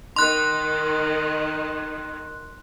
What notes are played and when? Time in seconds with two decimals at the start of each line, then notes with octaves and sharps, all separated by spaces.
0.16 D#3 C6 F#6